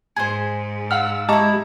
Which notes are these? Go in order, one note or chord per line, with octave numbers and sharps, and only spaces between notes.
G#2 G#4 C5
F5 F#5 E6 F6
G#3 D#4 E4 G4 A5 A#5 C#6